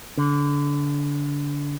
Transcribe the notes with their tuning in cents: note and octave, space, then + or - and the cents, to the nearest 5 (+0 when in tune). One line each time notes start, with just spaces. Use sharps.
D3 -25